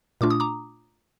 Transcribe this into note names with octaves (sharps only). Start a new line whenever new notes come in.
A#2 A3 D4 F4 D6
D#6
A#5 D6